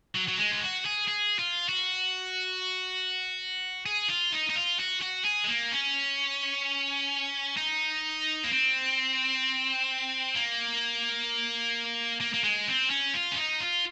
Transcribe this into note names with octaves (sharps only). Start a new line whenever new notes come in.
F#3
F#3
G#3
F4
F#4
G#4
G#4
F4
F#4
G#4
F4
D#4
D#4
F4
F#4
F#4
G#4
G#3
A#3
C#4
D#4
A#3
C4
A#3
A#3
A#3
G#3
C4
C#4
F4
C#4
D#4
F4